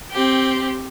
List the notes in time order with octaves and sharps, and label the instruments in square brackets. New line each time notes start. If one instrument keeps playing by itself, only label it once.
[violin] C4 G4